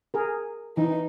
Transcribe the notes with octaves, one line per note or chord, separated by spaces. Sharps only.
G#4 A#4
E3 D#4